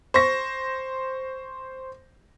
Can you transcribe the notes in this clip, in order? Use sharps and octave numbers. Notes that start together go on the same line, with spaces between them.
C5 C#6 A#6